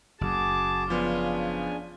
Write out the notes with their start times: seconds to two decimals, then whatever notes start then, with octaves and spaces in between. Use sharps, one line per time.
0.21 F#1 F#4 G#4 A5 D6
0.90 C#3 F3 B3 D4 F4 G#5